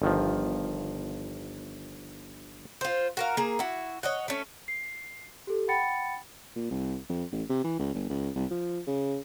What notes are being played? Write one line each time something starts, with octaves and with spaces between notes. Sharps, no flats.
G1 D#3 F3
F4 C5
F#4 A#4 F5
A#3 G#4
E4 F#4
C#5 D#5 F#5
A3 C#4
C7
G4 A4
F#5 G5 B5 A6 C#7
A#2
C2
F2
A1
C3
E3
C#2
G1
C#2
C2
F3
C#3